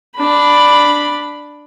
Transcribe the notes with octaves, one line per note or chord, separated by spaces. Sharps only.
D4 B5